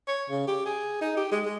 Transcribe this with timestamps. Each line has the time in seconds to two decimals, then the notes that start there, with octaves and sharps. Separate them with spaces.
0.08 C#5
0.30 C#3
0.48 G4
0.66 G#4
1.01 D#4
1.17 G4
1.32 G#3
1.45 G#3